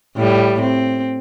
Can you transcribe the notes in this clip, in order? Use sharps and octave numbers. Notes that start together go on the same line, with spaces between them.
A2 G3
C4